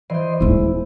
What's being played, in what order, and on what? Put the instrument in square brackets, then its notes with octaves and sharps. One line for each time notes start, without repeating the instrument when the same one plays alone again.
[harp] E3 C5 [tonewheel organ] D5 D#5 C6
[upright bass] D#1 C4 [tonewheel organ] G#3 E4